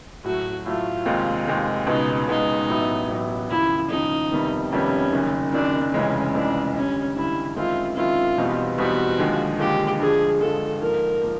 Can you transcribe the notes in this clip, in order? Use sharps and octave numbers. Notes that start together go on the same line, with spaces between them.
A2 F#3 A3 F#4
A2 F#3 A3 F4
F1 D#2 D#3 G#3 C4
F1 D#2 D#3 G#3 C4
C#2 B2 G#3 B3 D#4
C#2 B2 G#3 B3 D#4
A1 A2 F#3 B3 E4
A1 A2 F#3 B3 E4
D#2 C#3 F3 E4
D#2 C#3 F3 D#4
F2 C3 D#3 G3 B3
F2 C3 D#3 G3 B3 C#4
F#1 F#2 D#3
F#1 F#2 D#3 D4
F1 F2 C#3 E3 G#3 C#4
F1 F2 C#3 E3 G#3 D4
G2 D3 G3 C#4
G2 D3 G3 E4
F#2 D#3 G#3 C4 E4 F4
F#2 D#3 G#3 C4 E4 F4
E2 B2 G3 C4 D#4
E2 B2 G3 C4 D#4 F#4
D#2 D3 F3 G#3
D#2 D3 F3 G#3 G4
G2 D3 F3 G#3 G#4
G2 D3 F3 G#3 A4
G#2 F3 A#3 A#4
F3 A#3